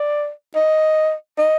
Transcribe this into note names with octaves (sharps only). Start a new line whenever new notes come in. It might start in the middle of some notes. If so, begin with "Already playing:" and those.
Already playing: D5
D#5
D#5